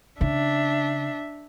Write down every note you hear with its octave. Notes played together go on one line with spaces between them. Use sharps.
C#3 D4 E5